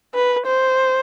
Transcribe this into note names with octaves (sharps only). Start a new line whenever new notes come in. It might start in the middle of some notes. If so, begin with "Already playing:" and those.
B4
C5